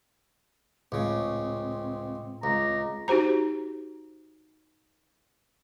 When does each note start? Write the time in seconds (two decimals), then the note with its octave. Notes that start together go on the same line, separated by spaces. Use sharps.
0.92 C#2 A2 C#3 C4
2.43 C#2 A#5
3.08 D#4 F#4 G4 C5 A#5